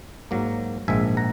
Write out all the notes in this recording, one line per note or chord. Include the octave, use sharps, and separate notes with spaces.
G#2 F#3 A#3
A#1 G#2 D#3 G#3 E5 G#5
F#5 A#5